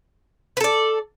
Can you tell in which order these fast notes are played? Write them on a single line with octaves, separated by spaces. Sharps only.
B4 A4 D5